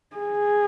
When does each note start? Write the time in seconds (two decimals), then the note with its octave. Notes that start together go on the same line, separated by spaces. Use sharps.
0.16 G#4